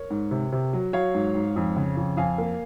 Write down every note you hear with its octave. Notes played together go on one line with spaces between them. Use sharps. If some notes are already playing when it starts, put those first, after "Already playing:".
Already playing: A#4 C#5
G#2
C3
C3
F#3
F#3 C#5 F5
G#2
G#2
F2
C#3
F2
F2 F5 G#5
A#3